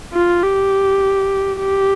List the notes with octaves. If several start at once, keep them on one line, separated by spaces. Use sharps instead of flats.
F4
G4
G4